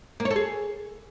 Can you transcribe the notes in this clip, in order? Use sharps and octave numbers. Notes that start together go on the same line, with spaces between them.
A#3
C#5
A4
G#4